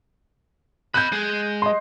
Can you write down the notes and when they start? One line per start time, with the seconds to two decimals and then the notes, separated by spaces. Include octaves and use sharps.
0.94 D#5 B5 F#6 G6
1.12 G#3 G#4
1.62 D#5 C6